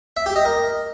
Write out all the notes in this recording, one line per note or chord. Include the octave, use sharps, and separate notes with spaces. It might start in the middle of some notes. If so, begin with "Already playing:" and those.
E5
G4
D#5
A#4